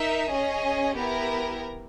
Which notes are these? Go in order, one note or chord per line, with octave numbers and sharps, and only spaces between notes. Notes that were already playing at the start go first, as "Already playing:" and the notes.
Already playing: D#4 A#4 E5
C#4 G#4 D#5
B3 E4 G4 A#4